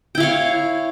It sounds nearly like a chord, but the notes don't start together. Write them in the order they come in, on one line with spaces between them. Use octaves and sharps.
G5 E4 F5 C#5